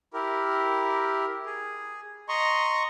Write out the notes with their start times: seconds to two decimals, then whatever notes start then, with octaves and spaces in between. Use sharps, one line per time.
0.14 E4 G4 A#4
1.46 G#4
2.29 D#5 A#5 C6 C#6